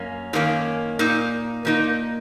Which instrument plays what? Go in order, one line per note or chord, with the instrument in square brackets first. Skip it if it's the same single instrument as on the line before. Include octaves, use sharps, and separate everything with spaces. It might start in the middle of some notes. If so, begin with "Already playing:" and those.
Already playing: [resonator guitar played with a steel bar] F#2 A#3 C#4
F#2 D#3 A#3 C#4
A#2 A#3 D#4
A#2 A#3 D#4